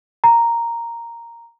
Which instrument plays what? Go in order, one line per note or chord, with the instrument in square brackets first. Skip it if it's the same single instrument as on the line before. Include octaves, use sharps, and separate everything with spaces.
[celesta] A#5